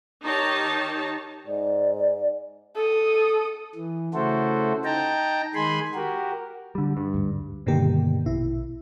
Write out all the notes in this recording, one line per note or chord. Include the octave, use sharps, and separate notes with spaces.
D#3 D#4 G4 C#5 A5
G#2 D5
A4 D#6
E3
C#3 A3 E4 F#4 A4 C5
D#4 G5 A5 A#5
D#3 G#3 G#5 B5 C6
F#4 G4 A#4
D3 G3
G2
D2 G#2
G2 B2 D3 D#3 A#3 G4
A#1 B2 E4